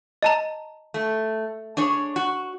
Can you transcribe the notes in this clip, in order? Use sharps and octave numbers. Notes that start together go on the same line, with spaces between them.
D#5 A5 A#5
A3
D4 G#4 C#5
F#4